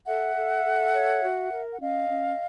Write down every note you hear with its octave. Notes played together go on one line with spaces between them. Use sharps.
A4 E5 F#5
A4
A4
C#5
F#4
A#4
F#5
C#4 D#5 F5
C#4